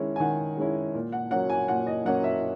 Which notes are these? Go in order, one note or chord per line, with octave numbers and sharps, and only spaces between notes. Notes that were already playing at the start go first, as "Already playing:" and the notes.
Already playing: D#3 G#3 C#4 E4
G#5
D#3 F#5
G#3 C#4 E4
A#2
F#5
F#3 A#3 C#4 F#5
G#5
A#2 F#5
D#5
F#3 A#3 C#4 F#5
E5